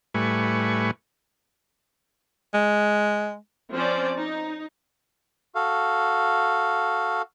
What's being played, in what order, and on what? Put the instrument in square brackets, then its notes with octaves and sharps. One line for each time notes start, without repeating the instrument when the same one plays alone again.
[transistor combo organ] A2 G3 A3 B4 G#5 C#6
[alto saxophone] G#3
[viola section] F3 C4 C#4 C5 D5
D#4
[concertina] F#4 A4 F5